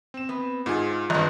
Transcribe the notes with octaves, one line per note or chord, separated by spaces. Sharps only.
C4 E7
B3
G#2 F4 G#4
G#1 G2 A#5